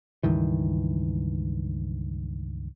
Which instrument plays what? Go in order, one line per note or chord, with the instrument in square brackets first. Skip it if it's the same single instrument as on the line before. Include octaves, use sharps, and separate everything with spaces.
[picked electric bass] C#2 G2 D#3 E3